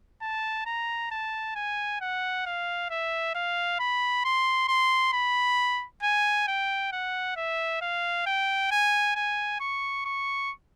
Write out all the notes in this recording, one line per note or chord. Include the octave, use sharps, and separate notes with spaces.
A5
A#5
A5
G#5
F#5
F5
E5
F5
B5
C6
C6
B5
G#5
G5
F#5
E5
F5
G5
G#5
G#5
C#6
C#6